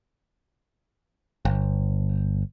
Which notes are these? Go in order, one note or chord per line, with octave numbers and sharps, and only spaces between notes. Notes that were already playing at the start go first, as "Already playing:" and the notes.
G1